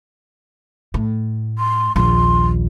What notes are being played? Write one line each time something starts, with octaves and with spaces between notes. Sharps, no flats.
A2
C6
A#1 D#2 C6